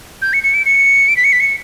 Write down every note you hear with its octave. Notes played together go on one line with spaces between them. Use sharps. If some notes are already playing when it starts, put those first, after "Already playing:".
G6
C#7
C#7
D7
C#7
D7
B6
C#7
B6
C#7